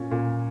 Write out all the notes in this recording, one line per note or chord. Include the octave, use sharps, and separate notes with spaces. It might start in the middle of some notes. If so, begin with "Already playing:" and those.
Already playing: A#2 C#4
A#2